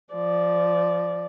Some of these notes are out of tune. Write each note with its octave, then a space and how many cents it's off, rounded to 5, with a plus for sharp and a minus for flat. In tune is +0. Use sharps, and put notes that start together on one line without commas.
F3 -15 D5 +0